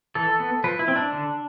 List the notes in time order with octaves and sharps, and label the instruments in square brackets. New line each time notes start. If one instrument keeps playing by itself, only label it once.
[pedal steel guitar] E3 A4
B3
F3 B4
E4
C4
D4
D3